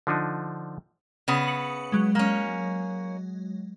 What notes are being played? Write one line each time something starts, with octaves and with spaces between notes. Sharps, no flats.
D3 F3 D4 D#4
C#3 B3 D#6
C#7 F#7
F#3 G#3
A#3 C#4